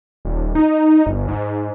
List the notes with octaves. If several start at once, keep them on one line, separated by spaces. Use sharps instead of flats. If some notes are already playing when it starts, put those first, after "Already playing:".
D#1
D#4
G1
G#2